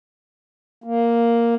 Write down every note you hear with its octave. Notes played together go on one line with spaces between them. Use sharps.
A#3